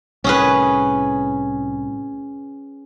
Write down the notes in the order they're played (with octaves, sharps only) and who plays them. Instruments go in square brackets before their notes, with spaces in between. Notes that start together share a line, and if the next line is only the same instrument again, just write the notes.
[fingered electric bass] C2 A2 [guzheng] C#4 G#4 B4